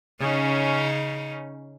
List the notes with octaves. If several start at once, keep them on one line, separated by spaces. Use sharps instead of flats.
C#3 C#4 D#4